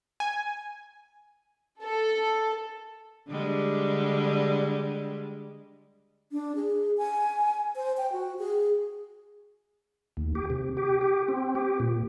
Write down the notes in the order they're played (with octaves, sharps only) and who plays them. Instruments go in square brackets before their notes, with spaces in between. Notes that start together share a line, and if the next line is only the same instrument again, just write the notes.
[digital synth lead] G#5
[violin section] A4
[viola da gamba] D3 G3 G#3
[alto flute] D4
G#4
G#5
C5
G5
F#4
G#4
[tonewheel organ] D#2
G4
C3
G4
G4
C4
G4
A#2